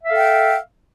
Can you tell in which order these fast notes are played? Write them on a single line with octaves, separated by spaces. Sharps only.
E5 F5 A4 G5